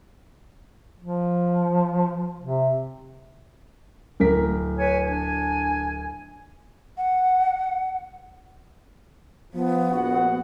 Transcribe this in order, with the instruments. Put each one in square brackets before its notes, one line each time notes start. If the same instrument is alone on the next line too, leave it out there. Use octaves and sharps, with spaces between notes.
[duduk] F3
C3
[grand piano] D1 A#4 B6
[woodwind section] B4 C#5 G#5
D4 G#5
[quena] F#5
[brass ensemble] F3 [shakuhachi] B3
[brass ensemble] A#1 F#4 F#5